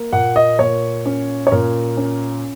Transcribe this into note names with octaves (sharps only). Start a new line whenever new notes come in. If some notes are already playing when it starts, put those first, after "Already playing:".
Already playing: A#3
A#2 F#5
D#5
A#2 C#5
C#4
C#5
A#2 A#4
C#4